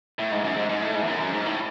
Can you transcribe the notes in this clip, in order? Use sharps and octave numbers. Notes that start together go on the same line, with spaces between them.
A2
G#2
F#2
G#2
G#2
A2
G#2
E2
F#2
F#2
G#2
A2